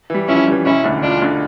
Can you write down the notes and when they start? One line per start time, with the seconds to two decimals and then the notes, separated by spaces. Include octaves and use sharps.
0.10 E3 G3
0.28 F2 C#4 E4
0.47 E3 G3
0.65 E1 C#4 E4
0.84 D2 D3
1.03 E1 D4 F4
1.22 D2 D3